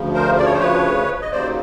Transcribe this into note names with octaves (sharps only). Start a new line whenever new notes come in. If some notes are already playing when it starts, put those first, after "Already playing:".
Already playing: D2 C#3 F3
A#4 C5
D5
C#5
C5
B4 C#5
D#5
D#2 C#3 F#3 C5 D5